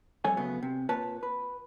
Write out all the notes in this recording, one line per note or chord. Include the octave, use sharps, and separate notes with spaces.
F2 G3 A4 C#5 G#5
C#3 F#3 A3 B3
C3
A#2 B4 C#5 A5
B4